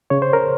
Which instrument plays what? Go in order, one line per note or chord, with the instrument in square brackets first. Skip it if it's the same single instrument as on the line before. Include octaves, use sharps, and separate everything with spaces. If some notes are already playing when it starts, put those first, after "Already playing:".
[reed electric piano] C#3 C#5
C5
A#4